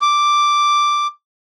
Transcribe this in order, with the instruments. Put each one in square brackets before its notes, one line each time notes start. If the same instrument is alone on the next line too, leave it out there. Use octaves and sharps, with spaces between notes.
[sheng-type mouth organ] D6